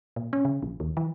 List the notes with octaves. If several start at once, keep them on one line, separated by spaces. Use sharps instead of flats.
A#2
C#4
C#3
A#1
D#2
E3